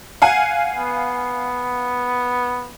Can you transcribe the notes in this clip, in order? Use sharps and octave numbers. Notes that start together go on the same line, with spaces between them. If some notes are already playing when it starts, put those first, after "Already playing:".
F5 F#5 G#5
B3